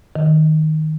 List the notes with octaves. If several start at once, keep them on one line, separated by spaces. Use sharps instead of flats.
D#3